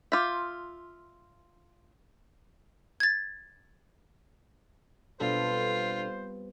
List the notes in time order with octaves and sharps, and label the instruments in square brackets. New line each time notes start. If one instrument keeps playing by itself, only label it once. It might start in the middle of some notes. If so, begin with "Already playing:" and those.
[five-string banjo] F4 E5 [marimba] C6 D6 G6
[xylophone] G#6 A6
[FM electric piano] B2 D4 A4 [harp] G3 B3 C4 [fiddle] F4 [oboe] C5